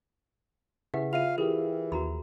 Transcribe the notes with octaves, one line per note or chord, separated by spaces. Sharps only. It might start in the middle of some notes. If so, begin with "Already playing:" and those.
C#3 E4 G4 G#4 B4 E5 F#5
F4 E5 F5 D#7 F7
E3 E4 G4 G#4 A#4
D#2 F#4 A#5 B5